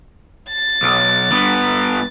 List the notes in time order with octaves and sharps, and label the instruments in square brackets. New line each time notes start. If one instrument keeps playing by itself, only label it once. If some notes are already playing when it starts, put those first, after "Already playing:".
[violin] A6
[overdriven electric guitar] B1
G2 B3